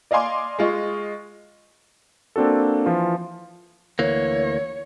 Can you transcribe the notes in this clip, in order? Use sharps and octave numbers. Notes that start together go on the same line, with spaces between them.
D5 D#5 F5 G#5 C6 D6
G#3 F4 D#5 C#6
A#3 C4 D4 F#4 A4
E3 F3 F4
D2 E3 A#3 C#5